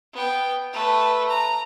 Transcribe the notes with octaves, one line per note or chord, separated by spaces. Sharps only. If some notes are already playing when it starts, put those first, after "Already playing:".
B3 G5
A3 B4
A#5